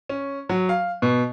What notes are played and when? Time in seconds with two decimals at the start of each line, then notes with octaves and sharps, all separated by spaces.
0.09 C#4
0.49 F#3
0.69 F5
1.02 B2